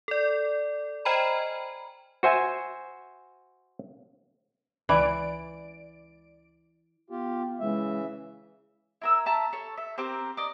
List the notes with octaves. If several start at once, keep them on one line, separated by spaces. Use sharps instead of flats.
A4 D5
C5 D#5 G5 G#5 A#5 B5
F#4 C5 E5 G#5
C#2 E3 D5 D7
B3 F4 G4
C#3 E3 G#3 E5
E4 A#4 E6
E5 A5 A#5
A4 C#5
E5
C4 G4 A#4 C5
D5 D#5